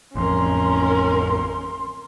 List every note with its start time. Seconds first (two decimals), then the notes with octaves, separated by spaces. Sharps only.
0.15 A1 F2 C#4 A#4 C6